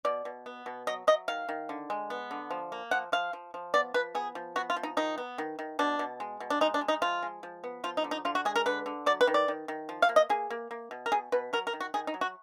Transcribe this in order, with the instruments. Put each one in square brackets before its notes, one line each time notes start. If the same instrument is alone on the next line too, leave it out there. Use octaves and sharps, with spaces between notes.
[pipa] B2 D5
B2
B3
B2
F#3 D#5
F#3 D#5
D#3 F5
D#3
D3
G#3
B3
D3
F3
A#3
F3 F#5
F3 F5
F3
F3
B3 D5
F3 B4
B3 G#4
F3
B3 F#4
F4
F3
D#4
D#3 D#4
B3
D#3
D#3
B2 D4
B2
G#3
B2
D4
G#3 D#4
D4
G#3
D#4
F3 F4
G#3
F3
B3
F3 F4
D#4
D3
D#4
D3 F4
F#4
G#3 G#4
A#4
D3 B4
D3
F#3 D5
B4
D#3
D5
D#3
D#3
F3
F5
A#3
D#5
A#3 G#4
A#3
A#3
B2
A#4
B2 G#4
B2 B4
F#3 A#4
A#4
D#3
F#4
D#3 G#4
D#4
F#3
F#4